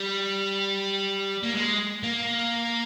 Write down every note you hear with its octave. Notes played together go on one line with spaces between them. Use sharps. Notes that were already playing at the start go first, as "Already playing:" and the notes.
Already playing: G3
A#3
G#3
A#3